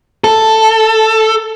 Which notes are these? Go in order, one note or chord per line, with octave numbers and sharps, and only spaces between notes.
A4